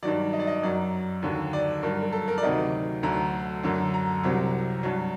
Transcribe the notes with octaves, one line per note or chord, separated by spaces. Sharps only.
G2 D#3 F#3 D5
D#5
D5
D#5
F#2 F#3 D5
D#2 D3 F#3
D5
G2 F#3 A#4
A#4
A4
A#4
D5
D2 C3 D#3 F#3 D#5
D2 D3 F#3 A#5
F#2 D3 F#3
A#5
C2 C3 F#3
G2 F#3